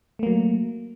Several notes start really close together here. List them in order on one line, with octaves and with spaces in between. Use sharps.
A3 A#3 F#3